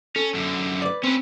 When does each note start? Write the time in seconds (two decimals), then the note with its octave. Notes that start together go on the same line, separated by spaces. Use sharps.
0.16 C#4 A4
0.34 F#2 D3
0.82 B4 D5
1.03 C4 C#4 B4